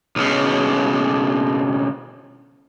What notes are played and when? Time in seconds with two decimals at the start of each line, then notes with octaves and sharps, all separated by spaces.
0.16 B1 C#3